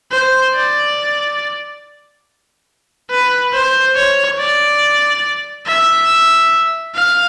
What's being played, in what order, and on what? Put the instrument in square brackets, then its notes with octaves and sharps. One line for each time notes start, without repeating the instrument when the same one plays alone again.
[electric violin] C5
D5
B4
C5
C#5
D5
E5
F5